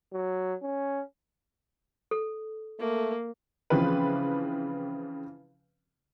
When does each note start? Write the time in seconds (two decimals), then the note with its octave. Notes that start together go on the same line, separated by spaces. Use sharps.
0.12 F#3
0.62 C#4
2.11 A4
2.79 A3 A#3
3.70 C#3 E3 F3 C4 B4